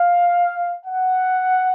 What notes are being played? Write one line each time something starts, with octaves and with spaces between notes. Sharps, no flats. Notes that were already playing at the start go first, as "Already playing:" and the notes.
Already playing: F5
F#5